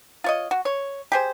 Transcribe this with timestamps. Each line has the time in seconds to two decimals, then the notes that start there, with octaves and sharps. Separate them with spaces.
0.24 F4 C#5 D#5
0.51 F#4
0.65 C#5
1.12 G4 G#4 C5